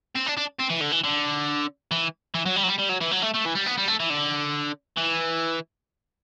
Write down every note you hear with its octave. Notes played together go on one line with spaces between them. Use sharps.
C4
D4
D4
C4
E3
D3
E3
D3
E3
E3
F#3
G3
F#3
G3
G3
F#3
E3
F#3
A3
A3
E3
G3
B3
G3
A3
E3
D3
E3